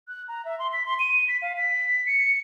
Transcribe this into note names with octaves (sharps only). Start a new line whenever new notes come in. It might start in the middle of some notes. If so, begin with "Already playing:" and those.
F#6
A#5
E5
C6
B6
C6
D#7
B6
F5
B6
C#7